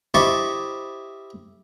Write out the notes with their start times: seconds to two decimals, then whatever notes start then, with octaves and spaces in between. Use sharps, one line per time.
0.14 E4 G4 C5 D#5 A5 C#6